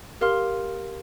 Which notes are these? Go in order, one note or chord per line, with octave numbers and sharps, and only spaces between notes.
G4 A#4 F5 C6 F6